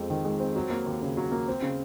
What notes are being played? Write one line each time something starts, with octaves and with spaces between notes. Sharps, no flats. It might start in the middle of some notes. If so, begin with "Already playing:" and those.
Already playing: F2 G#3 C4
D#3
G#3
C4
F#3
A#3
D#2
C#3
F#3
A#3
C4
C#3